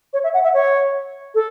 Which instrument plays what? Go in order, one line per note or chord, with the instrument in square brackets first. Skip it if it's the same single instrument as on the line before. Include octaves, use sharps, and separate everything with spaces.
[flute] C#5
E5
F#5
E5
C#5
A4